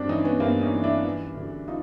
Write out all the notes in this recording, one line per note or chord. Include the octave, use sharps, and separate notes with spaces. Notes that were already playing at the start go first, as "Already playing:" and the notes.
Already playing: G2 C4 D4
E3 C#4 D#4
B3 C#4
G2 A#3 C4
C#4 D#4
E3
D4 E4
E3
D2
D#4 F4